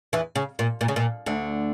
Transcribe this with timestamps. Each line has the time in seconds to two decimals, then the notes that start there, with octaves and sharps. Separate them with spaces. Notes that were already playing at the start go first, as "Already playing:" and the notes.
0.13 E2 E3
0.36 C#3
0.59 A#2
0.81 A#2
0.88 C#3
0.96 A#2
1.26 D2 D3